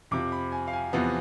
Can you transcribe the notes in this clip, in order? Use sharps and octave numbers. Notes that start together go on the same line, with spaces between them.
F2 C3 F3 D6
B5
G#5
F5
G#5
E2 C3 F3 B3